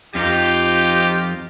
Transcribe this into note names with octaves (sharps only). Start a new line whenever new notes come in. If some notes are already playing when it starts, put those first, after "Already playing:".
F2 D#4 F4 G4